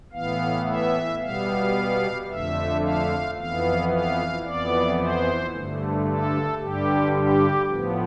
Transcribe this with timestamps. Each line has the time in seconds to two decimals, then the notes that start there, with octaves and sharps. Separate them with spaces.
0.13 A2 E3 B3 F5
0.66 E5
1.20 B2 G3 B3 F5
2.28 F2 D3 A3 E5
2.82 F5
3.36 F2 E3 B3 F5
3.91 F5
4.44 F2 E3 B3 D5
4.98 C5
5.52 G2 D3 A3
6.06 A4
6.60 G2 D3 G3 G4
7.14 G4
7.68 A2 F3 B3